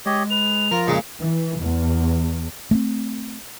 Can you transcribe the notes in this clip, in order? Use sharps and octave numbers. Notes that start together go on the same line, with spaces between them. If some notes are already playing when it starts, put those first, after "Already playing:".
G#3 G4 C#5 D#5
B4 F7
F3 F4 A#4 A#5
A#2 C#3 G#3
E3
E2
A3 B3 C4